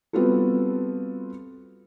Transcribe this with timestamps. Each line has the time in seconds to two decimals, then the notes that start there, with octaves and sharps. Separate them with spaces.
0.13 G3 B3 C4 F4 F#4 A4